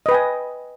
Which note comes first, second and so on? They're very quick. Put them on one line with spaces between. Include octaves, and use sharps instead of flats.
D#5 B4 G5 G#5